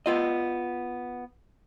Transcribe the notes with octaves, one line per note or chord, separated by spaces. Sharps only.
B3 F4 D#5